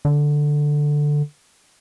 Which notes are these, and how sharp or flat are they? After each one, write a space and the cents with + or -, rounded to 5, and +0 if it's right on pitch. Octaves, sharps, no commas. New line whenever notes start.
D3 +5